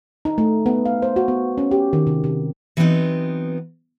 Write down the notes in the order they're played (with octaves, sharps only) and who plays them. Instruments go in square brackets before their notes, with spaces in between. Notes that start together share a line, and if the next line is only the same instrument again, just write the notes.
[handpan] D#4
A3
B3
F5
C5
F#4
B3
C#4
G4
D#3
C3
C3
[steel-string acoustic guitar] E3 F#3 A3 B3 C4 D#4